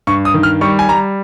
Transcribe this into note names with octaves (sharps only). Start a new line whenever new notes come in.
G2 C#6
D#6
D#3
F6
G3 C#6
G#5
G3 A#5